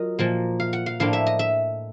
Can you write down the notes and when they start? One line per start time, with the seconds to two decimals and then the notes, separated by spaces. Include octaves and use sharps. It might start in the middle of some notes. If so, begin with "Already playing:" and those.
Already playing: F#3 F4 A#4 D#5
0.19 A#2 F3 A#3
0.60 F5
0.73 F#5
0.86 F5
1.00 A2 F3 A#3 D4 F4 F5
1.13 E5
1.27 D#5
1.39 E5